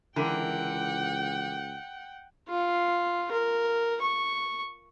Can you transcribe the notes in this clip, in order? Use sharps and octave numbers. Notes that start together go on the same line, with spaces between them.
C#2 D3 E3 A#4 F#5 G5
F4
A#4
C#6